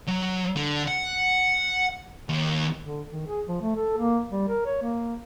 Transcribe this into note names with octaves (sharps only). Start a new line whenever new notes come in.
F#3
D3
F#5
D#2
D3
D#3
G#4
F3
A3
A4
A#3
G3
A#4
C#5
A#3